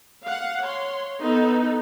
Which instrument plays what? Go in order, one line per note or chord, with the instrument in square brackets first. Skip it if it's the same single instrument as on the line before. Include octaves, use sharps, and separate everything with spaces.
[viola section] F5 F#5
C#5 C6
B3 D#4 A4 B4